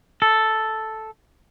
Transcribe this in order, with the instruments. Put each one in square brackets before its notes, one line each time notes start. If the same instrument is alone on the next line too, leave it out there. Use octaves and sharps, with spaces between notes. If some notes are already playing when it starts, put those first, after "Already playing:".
[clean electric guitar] A4